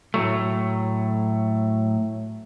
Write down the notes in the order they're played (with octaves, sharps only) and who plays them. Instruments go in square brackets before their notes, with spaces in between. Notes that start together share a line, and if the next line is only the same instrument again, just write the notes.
[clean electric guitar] A2 F#3 A3